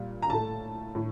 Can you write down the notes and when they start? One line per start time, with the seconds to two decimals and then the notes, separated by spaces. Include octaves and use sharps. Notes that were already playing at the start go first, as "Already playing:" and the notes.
Already playing: A#2 G3
0.22 A#5
0.30 A2 A3 A5
0.95 A2